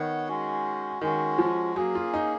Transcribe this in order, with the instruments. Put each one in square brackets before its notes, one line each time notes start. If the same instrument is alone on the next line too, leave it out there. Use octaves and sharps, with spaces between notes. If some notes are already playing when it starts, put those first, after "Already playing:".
Already playing: [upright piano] D#3 [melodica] B3 C#5 F#5
[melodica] G#3 C#4 F#4
[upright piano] D#3 [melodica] G#3 C#4 F#4
[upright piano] F3
[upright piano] F#3 [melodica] A#3 C#4 G#4
[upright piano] F4
D#4